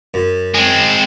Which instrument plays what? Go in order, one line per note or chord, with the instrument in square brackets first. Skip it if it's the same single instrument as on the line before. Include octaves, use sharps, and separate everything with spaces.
[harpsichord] F#2
[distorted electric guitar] G#3 C4